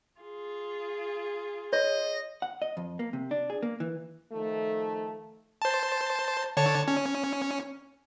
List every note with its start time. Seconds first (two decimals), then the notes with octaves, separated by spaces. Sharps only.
0.21 F4 G#4
1.73 C#5 D#5
2.42 F#5
2.62 D#5
2.77 F2
2.99 A#3
3.13 C3
3.31 D4
3.50 G#4
3.62 A#3
3.80 E3
4.32 D#3 F3 A3
5.62 C5 A5
6.57 D3 C#5 A5
6.88 C#4